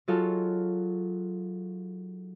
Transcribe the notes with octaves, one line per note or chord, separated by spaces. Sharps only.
F#3 D#4 F4 F#4 G#4 A4